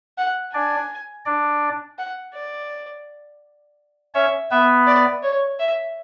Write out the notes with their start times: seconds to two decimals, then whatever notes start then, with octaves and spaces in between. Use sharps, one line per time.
0.18 F#5
0.54 D4 D5 G#5
1.26 D4 D5
1.99 F#5
2.34 D5
4.15 C#4 C#5 E5
4.51 B3 B4 E5
4.87 D5
5.23 C#5
5.60 E5